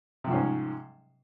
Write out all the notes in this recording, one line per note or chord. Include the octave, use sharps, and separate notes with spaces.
G#2 C3 F3 C#4